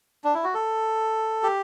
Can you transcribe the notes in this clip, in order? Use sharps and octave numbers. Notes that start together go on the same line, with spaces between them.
D4
E4
F#4
A4
G4